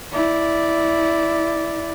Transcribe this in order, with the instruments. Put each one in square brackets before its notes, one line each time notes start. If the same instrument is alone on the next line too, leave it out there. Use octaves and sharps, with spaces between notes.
[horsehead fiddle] E4 D5